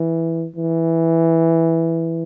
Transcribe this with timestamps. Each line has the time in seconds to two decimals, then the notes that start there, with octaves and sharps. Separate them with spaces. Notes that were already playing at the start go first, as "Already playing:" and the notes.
Already playing: E3
0.56 E3